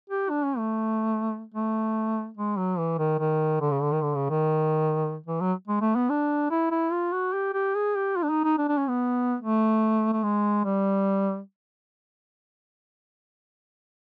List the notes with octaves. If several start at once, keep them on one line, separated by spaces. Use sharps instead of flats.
G4
D4
C#4
A3
A3
G#3
F#3
E3
D#3
D#3
D3
C#3
D3
D#3
D3
C#3
D#3
E3
F#3
G#3
A3
B3
D4
E4
E4
F4
F#4
G4
G4
G#4
G4
F4
D4
D#4
D#4
D4
D4
C#4
B3
A3
A3
G#3
G3